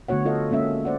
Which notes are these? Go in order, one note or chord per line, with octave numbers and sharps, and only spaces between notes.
D3 A3 B3 F#4 C#5 F#5
F4 A4 D#5 F5
G#3 A#3 C#4 E5
C5 D5 F#5